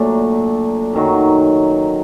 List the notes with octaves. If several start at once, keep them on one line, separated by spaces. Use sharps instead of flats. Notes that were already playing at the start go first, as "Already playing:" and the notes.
Already playing: A#2 F#3 A3 D4
F#2 D#3 F#3